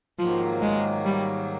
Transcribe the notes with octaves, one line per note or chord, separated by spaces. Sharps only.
G#2 D#3 F3 F#3 A#3
G#3
G3